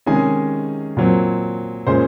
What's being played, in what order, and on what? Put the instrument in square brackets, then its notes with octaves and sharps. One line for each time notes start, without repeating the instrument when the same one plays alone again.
[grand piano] C3 D#3 G#3 C#4 G#4 G#5
A#2 F#3 C4
A#2 G#3 C#4 C5 C6